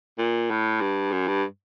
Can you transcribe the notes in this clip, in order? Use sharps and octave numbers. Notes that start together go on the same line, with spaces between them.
A#2
A2
G2
F#2
G2